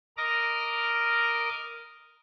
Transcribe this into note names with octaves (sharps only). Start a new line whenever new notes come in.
A#4 D#5 A#5 D6 F6